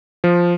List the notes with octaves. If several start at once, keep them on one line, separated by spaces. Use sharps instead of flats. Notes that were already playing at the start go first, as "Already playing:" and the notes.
F3